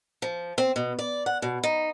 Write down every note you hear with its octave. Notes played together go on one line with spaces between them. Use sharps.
F3
C4
B2
D5
F#5
B2
D#4